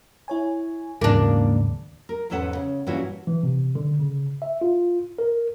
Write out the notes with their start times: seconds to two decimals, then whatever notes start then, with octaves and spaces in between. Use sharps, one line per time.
0.28 E4 C#5 G#5
1.01 D#2 G#2 C#3 E3 F#3 A#3 D4 D6
2.09 A#4
2.30 E2 G#2 C#4 A4 B4 F#5
2.55 C#3
2.87 G2 A#2 E3 C#4 E4 F#4
3.27 E3
3.43 C3
3.75 D3
3.99 C#3
4.42 E5
4.61 F4
5.19 A#4